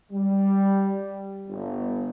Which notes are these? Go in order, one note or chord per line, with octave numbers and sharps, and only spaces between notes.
G3
G1